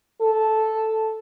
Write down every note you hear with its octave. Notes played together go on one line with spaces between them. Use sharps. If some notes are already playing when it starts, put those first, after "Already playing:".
A4